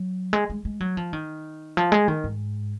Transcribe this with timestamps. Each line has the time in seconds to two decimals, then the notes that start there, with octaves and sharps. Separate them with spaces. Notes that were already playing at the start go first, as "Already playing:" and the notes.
Already playing: F#3
0.33 G#3
0.50 G#3
0.65 G#3
0.80 F#3
0.97 F3
1.13 D#3
1.77 F3
1.92 G#3
2.08 D#3
2.24 G#2